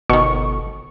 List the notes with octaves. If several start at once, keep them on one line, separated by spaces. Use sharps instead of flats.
G1 B2 D#3 C#6